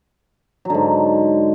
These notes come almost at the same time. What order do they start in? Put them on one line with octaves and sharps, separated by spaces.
F#3 D3 G#2